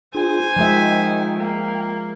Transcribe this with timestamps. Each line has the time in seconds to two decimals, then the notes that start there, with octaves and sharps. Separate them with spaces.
0.15 D4 F4 G#4 C5 G#5
0.56 D#3 F3 G#3 E5 G5
1.39 A#3